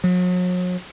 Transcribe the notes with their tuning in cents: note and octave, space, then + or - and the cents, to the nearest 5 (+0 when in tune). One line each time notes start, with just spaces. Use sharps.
F#3 -40